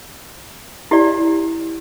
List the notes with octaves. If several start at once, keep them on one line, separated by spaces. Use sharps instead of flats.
E4 G4 D5